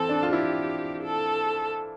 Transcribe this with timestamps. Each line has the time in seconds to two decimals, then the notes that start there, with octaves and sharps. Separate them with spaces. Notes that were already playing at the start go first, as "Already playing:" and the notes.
Already playing: E3 C4 A4
0.09 D4
0.23 F4
0.32 E4 G4
1.03 A4